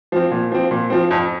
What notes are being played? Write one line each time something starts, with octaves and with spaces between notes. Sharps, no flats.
F3 C4
A#2
F3 C4
A#2
F3 C4
F2